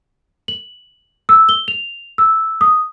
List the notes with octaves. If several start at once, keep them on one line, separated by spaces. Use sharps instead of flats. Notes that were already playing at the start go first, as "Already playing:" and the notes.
F#7
E6
G7
F7
E6
D#6